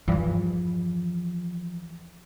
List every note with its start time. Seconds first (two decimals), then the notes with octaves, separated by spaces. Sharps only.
0.08 E2 G2 E3 F3